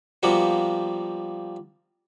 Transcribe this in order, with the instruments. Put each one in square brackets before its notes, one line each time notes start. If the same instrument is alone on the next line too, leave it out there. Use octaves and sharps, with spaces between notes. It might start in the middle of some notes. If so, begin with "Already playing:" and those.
[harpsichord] F3 G3 A#3 B3 F#4